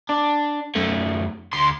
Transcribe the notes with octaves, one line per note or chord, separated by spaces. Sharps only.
D4
F#2 A3
D2 C6